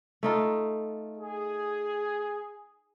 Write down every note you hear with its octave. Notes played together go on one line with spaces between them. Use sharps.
A3 D#4 F4
G#4